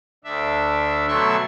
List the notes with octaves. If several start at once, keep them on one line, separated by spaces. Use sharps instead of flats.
D2 D4 E5
B2 F#3 A3 E5 C6 C#6